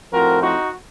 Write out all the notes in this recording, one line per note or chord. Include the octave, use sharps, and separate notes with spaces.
A2 F3 C4 F#4 A#4
D#4 F#4